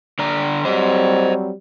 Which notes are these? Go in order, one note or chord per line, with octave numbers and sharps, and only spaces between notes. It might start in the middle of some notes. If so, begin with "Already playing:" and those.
D3 D5 A#5
F#3 G3 C4 C5 D#5